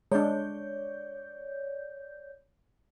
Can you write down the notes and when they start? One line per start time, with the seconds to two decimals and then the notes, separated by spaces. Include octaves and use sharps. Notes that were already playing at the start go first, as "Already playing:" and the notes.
0.12 G#3 D4 C#5 D5 G6